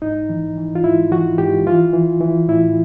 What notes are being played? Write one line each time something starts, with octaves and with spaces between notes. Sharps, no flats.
G#2 D#4
E3
E3
F4
G#2 E4
E3 F#4
G#2 G4
E3 F4
E3
E3
A2 E4